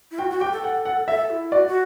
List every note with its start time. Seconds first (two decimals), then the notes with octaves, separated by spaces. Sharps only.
0.11 E4
0.18 F#4 G5
0.30 F#4
0.41 G4 G5
0.52 A4
0.64 F#5
0.85 F#5
1.08 A4 E5
1.30 E4
1.52 F#4 D5
1.67 F#4